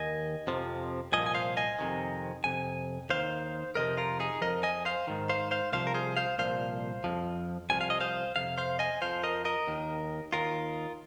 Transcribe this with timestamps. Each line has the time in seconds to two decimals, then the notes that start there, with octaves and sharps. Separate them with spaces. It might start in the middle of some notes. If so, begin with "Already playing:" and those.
Already playing: D#2 D#3 D#5 G#5
0.47 F2 C3 F3
1.12 C2 A#2 F3 D#5 G#5
1.26 G#5
1.34 C5 F5
1.57 D#5 G#5
1.79 F2 C3 D#3
2.44 F2 C3 G#5
3.10 D#2 D#3 C5 F5
3.75 F2 C3 F3 A#4 D#5
3.97 F4 A#4
4.20 D#4 G#4
4.41 F2 F3 A#4 D#5
4.63 D#5 G#5
4.85 C5 F5
5.07 G#2 D#3
5.29 C5 F5
5.51 C5 F5
5.72 C2 C3 F3 C5 F5
5.87 A#4
5.94 G#4 C5
6.17 C5 F5
6.38 C2 A#2 F3 C5 F5
7.04 F2 F3
7.70 C2 C3 F3 G#5
7.81 F5
7.90 D#5
8.01 C5 F5
8.36 F2 C3 F5
8.58 C5 F5
8.79 D#5 G#5
9.02 F2 F3 C5 F5
9.23 A#4 D#5
9.45 A#4 D#5
9.67 D#2 D#3
10.33 D#2 D#3 F4 A#4